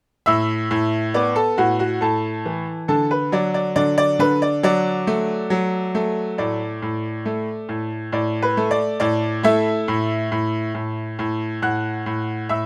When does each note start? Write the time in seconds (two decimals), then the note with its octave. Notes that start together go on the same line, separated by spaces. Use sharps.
0.26 A2 E5 E6
0.71 A2
1.14 B3 D5 D6
1.36 A4 A5
1.58 A2 F#4 F#5
1.79 F#4 F#5
2.01 A2 A4 A5
2.46 E3
2.88 D3 A4 A5
3.11 B4
3.32 F#3 D5
3.54 D5
3.76 D3 D5
3.98 D5
4.19 D3 B4
4.42 D5
4.63 F#3 D5
5.07 A3
5.50 F#3
5.95 A3
6.38 A2 D5
6.82 A2
7.26 A3
7.69 A2
8.12 A2 D5
8.42 B4
8.57 A3
8.71 D5
9.00 A2 D5
9.43 A3 E4 E5
9.88 A2
10.32 A2
10.74 A2
11.19 A2
11.62 A2 F#5 F#6
12.06 A2
12.49 A2 E5 E6